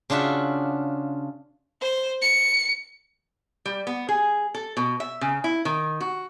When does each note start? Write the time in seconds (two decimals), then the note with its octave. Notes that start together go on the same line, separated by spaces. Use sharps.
0.10 C#3 D4 F4 F#4 E5
1.82 C5
2.22 C#7
3.66 G3
3.87 B3
4.09 G#4
4.55 A4
4.77 B2
5.00 E5
5.21 C#3
5.44 E4
5.65 D#3
6.01 F#4